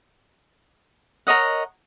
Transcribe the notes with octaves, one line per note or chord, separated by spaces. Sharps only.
A#4 C#5 D#5 F#5